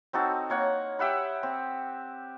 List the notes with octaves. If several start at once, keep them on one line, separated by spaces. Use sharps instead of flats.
C4 D#4 F#4 A4
A#3 C#5 F#5
G4 E5 F#5 B5
C4